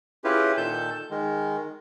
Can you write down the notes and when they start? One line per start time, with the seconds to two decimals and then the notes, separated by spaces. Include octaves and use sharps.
0.24 C#4 E4 F4 G4 G#4 B4
0.57 A#2 D#3 A4 A5 G6
1.10 D#3 G#3